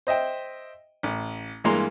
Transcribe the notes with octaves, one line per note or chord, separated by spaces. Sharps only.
C5 D#5 E5 G5
A1
G2 E3 G#3 A#3 A#5 C6